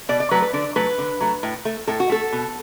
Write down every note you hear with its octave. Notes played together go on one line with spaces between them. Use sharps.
B2 D5
D5
F#3 A3 B4
B4
D3 D5
F#3 A3 B4
D3
F#3 A3
A2
A3
A2 A4
F#4
A3 A4
B2